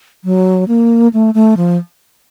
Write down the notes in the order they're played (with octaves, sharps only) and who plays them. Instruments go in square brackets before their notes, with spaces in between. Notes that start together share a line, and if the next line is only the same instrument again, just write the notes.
[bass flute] F#3
A#3
A3
A3
F3